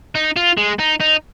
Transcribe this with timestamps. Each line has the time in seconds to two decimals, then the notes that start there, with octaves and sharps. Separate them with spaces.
0.15 D#4
0.37 F4
0.58 G#3
0.79 D#4
1.00 D#4